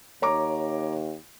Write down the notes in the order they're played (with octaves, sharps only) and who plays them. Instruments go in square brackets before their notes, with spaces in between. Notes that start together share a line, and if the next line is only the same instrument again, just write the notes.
[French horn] D#2 [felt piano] C#5 A#5 D6